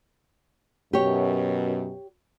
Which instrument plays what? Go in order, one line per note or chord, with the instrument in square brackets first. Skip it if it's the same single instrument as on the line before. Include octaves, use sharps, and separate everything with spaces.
[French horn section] F#2 B2 [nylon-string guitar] G4 C#5